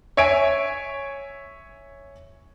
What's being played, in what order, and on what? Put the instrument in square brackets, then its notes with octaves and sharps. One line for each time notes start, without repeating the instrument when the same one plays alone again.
[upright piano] C#5 E5 G#5 D7